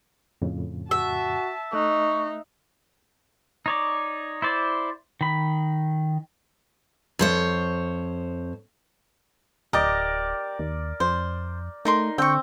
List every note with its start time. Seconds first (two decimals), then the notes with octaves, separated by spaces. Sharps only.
0.42 F2 A2 C#3
0.91 F#4 E5 A5
1.73 A3 D#4 C#6 F#6
3.66 D#4 C#5 D5
4.42 E4 C5 D5
5.21 D#3 B5
7.19 F2 C5 C#5
9.73 D1 G4 A#4 D5 D#5
10.59 D#2
11.00 F2 C5
11.85 A3 D#4 A#4 C6
12.18 D3 C4 G5 C#6